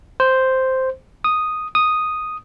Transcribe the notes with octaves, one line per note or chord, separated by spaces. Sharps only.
C5
D#6
D#6